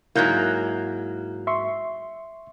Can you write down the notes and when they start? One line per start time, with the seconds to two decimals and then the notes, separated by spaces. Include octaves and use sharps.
0.15 G#2 F#3 A#3 E4 G6
1.47 E5 C6 C#6